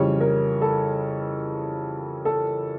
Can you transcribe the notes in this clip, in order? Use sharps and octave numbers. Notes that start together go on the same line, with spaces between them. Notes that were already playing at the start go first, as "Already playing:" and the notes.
Already playing: F2 C#3 E3 G3 C#5
A#4
A4
A4